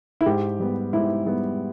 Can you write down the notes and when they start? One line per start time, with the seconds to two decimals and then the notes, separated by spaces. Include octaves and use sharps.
0.21 E4
0.26 G#2 G4
0.60 G3 B3
0.93 G#2 E4
1.26 G3 B3